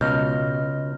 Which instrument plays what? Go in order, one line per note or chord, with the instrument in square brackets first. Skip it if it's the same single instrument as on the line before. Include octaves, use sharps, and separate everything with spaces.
[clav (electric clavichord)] C#2 [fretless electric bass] B2 [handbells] D#5 F6 G6